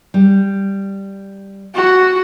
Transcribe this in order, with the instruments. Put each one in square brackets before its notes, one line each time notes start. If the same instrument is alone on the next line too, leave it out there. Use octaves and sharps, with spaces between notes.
[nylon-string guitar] G3
[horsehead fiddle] F#4